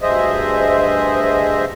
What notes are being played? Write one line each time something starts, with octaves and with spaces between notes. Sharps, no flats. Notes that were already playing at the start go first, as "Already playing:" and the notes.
D2 G2 G#4 C5 D#5 E5